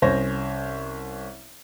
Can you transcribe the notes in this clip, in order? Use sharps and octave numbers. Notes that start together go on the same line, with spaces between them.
C2 C#4 C5 C#5 A#6